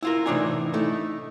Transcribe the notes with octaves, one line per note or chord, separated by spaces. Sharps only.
E4 F4 A#4
A2 C3 E3 D4 D#4 G#5
A3 D#4 E4